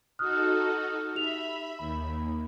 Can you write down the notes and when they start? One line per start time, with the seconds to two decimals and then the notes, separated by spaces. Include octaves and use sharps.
0.19 D#4 F#4 A4 D#6 F6 F#6
1.15 D#4 G4 E5 B5 F7
1.79 D#2 B5